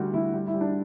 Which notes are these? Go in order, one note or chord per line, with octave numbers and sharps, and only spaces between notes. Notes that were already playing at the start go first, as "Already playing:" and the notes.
Already playing: D2 D3 G3 F#4
D2 E4
G3
E4
G3
D4